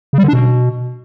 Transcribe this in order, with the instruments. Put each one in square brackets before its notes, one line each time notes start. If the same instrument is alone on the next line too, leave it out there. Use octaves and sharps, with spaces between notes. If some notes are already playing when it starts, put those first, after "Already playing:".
[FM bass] C#3
G3
D3
D4
B2